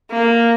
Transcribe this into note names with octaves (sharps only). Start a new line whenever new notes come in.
A#3